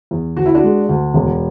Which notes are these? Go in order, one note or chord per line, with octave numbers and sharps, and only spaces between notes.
E2
D2 F#4
E4
D4 F#4
G#3
D2
E1